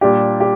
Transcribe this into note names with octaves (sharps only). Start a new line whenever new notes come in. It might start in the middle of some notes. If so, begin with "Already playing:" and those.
A#2 G3 D4 G4
G4